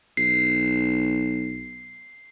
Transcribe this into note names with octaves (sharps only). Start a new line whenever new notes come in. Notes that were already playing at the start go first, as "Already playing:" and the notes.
B1 C7